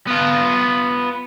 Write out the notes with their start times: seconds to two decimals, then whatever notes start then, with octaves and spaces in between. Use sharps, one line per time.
0.07 B3 F4